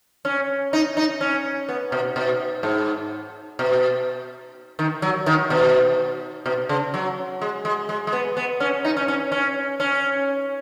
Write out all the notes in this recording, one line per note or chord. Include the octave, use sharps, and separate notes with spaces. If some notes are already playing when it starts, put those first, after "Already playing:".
C#4
D#4
D#4
C#4
B3
B2
B2
G#2
B2
D#3
F#3
D#3
B2
B2
C#3
F#3
G#3
G#3
G#3
G#3
B3
B3
C#4
D#4
C#4
C#4
C#4
C#4